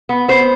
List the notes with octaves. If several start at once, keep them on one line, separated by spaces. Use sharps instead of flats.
B3
B3 C5